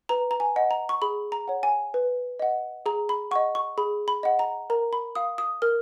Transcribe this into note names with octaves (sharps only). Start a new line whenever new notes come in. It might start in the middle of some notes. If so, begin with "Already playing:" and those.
B4 A#5
A#5
G#5
D#5 F#5
A#5
C#6
G#4 B5
A#5
C#5 F#5
G#5
B4
D#5 F#5
G#4 A#5
B5
D#5 F#5 C#6
C#6
G#4 B5
B5
D#5 F#5
A#5
A#4 A#5
B5
F5 D#6
D#6
A#4 F6